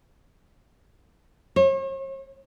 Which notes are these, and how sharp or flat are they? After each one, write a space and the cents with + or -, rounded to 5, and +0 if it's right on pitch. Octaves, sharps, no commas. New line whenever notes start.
C#5 -45